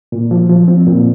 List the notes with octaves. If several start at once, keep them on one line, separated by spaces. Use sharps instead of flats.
A#2
F3
F3
C4
A#2